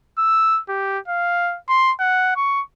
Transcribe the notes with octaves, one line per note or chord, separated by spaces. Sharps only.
E6
G4
F5
C6
F#5
C#6